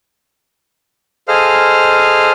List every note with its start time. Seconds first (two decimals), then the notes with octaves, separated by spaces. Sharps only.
1.28 G#4 A4 C5 D#5 F5 F6